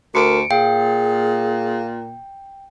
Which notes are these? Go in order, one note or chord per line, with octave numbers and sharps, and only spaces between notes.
D2 A#4 C#7 D7
A#2 G#4 F5 G5